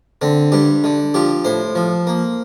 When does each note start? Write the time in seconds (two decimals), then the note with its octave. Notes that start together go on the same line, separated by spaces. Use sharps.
0.21 D3 C4
0.52 G2 G4
0.84 D3
1.14 F3 G4
1.44 A2 C5
1.75 F3
2.07 A#3